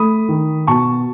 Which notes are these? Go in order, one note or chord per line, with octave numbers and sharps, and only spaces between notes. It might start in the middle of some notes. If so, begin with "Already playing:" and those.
Already playing: A3 B5 D#6
D#3
B2 A5 C#6